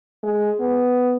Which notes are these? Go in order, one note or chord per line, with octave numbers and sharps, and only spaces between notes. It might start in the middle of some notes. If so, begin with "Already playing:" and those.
G#3
B3